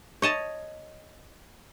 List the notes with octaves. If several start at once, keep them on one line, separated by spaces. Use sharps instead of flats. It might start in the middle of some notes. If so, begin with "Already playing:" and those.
C#5 D#5 A5